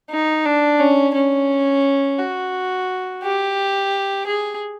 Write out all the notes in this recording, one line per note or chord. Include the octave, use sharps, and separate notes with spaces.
D#4
D4
C#4
C#4
F#4
G4
G#4